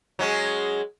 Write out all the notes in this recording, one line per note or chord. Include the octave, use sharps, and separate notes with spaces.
F#3 G#3 C#4